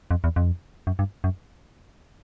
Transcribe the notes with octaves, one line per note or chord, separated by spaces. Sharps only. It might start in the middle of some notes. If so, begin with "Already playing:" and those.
F2
E2
F2
F#2
G2
F#2